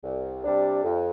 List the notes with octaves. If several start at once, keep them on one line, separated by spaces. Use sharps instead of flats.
C2
C3 G3 D4
F2